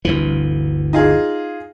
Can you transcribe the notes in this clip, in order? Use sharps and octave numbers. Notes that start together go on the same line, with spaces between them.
G1 D2 E3
D#4 F4 G#4